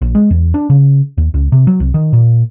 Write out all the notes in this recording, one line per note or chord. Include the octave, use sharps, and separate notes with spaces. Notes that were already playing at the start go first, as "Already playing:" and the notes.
A#1
G#3
E2
D4
C#3
D#2
C#2
C3
F#3
C2
D#3
A#2